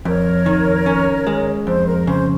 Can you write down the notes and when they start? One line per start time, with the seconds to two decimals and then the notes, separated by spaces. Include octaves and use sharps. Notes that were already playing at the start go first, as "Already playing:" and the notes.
0.05 F2 A#4 C#5
0.46 D#3
0.86 C#4
1.27 G#3
1.67 F2 C5
1.87 A#4
2.07 C#3 C5